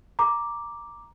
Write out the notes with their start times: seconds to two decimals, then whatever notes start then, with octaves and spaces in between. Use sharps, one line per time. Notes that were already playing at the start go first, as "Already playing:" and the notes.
0.19 A#5 D6